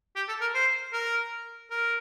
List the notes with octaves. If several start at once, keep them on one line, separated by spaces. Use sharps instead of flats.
G4
A4
A#4
C5
A#4
A#4